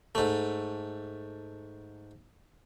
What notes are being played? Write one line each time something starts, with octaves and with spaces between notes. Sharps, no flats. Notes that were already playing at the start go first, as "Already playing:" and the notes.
G#2 A3